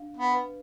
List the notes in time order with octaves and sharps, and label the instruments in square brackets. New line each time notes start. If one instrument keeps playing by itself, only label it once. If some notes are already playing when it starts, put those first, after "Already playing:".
Already playing: [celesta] D4 F5
[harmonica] B3
[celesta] B4